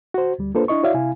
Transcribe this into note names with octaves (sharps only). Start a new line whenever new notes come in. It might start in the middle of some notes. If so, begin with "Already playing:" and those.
F#4 C5
D2 G3
A#3 D4 F4 A4 B4 C5
D4 E4 D#5 C#6
E4 F#4 C#5 D5 E5 F5
C3 E4 F5 G#5